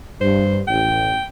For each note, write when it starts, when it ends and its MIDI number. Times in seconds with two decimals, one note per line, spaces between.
0.21 0.60 43
0.21 0.60 72
0.68 1.13 33
0.68 1.24 79